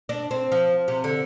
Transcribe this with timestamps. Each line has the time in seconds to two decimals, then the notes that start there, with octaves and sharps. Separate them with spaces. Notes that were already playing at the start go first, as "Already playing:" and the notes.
0.09 D4
0.31 C4
0.52 F3
0.88 C3
1.04 D3